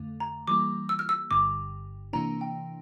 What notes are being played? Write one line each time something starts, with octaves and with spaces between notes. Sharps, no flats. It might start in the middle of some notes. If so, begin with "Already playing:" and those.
Already playing: F2 D3 A3
A#5
E3 G3 A#3 D6
E6
F6
E6
G1 G2 D3 D6
C3 E3 A#3 D4 A#5
G5